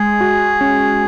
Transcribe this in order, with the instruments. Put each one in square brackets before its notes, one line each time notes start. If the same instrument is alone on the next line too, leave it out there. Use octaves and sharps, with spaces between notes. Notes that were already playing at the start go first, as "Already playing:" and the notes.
Already playing: [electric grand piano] G#3 [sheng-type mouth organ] G#4
[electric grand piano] F#4
C#4